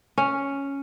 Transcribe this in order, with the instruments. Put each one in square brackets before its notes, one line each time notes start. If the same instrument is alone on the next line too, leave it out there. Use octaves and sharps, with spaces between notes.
[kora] C#4